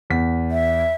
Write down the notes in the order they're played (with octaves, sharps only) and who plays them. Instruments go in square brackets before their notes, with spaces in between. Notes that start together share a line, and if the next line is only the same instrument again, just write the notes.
[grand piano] E2 B6
[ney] E5